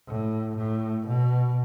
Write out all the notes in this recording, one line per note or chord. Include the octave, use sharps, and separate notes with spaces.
A2
A2
B2